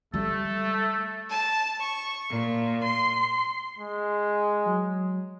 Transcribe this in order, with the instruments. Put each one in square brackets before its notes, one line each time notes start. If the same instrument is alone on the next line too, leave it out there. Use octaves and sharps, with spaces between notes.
[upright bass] G3 [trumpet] A3 [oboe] A4
[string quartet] A5
C#6
A#2
C6
[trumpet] G#3
[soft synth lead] F#3